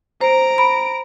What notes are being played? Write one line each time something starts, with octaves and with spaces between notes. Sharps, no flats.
C5 A#5 D7
B5